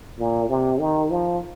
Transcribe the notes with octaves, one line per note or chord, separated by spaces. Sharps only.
A#2
C3
D#3
F3